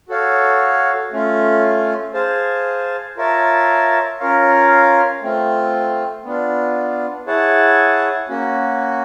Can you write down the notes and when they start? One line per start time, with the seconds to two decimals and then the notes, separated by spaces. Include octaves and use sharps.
0.09 F#4 A4 C#5 F5
1.12 A3 C#4 F4
2.14 G#4 C5 F5 A5
3.17 F4 A#4 C#5 E5 A5
4.19 C#4 F4 A#4 C#5 F5
5.22 A3 C4 F4
6.24 B3 D4 F4
7.26 E4 G#4 C#5 F#5 A5
8.29 A#3 C#4 F#4